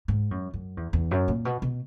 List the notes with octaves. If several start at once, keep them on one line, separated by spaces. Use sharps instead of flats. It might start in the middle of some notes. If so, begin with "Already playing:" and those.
G#2
F#2
F#2
E2
E2
F#2
A#2
B2
B2